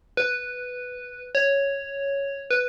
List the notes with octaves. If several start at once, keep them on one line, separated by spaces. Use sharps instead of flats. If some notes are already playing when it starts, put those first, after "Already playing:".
B4
C#5
B4